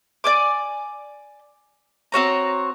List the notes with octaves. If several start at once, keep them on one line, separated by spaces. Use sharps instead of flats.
D5 G#5 D6
C4 F#4 C#5 A#5